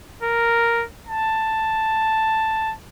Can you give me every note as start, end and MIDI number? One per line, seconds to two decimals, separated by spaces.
0.23 0.84 70
1.07 2.74 81